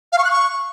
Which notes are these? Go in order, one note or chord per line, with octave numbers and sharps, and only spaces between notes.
F5
C#6
F#6
C#6